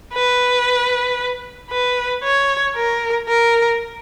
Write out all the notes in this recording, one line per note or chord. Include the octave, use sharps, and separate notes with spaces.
B4
B4
C#5
A#4
A#4